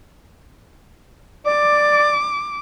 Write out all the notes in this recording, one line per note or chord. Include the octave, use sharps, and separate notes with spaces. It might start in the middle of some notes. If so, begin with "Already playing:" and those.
D5 D6